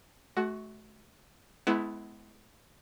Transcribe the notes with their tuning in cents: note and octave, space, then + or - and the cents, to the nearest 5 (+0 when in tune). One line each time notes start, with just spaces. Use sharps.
A3 -35 F#4 +10
G#3 +35 B3 +25 E4 +0